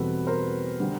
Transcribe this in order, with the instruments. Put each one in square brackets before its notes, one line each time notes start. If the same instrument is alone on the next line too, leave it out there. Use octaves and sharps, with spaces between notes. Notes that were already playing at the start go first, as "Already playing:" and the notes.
Already playing: [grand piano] E2 B2 G3 C4 A4 B4
A#4 C5
D3 G3